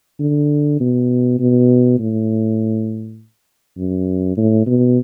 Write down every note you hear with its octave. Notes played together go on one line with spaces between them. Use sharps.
D3
B2
B2
A2
F#2
A2
B2